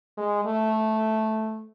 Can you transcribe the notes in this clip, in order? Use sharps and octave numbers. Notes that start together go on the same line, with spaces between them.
G#3
A3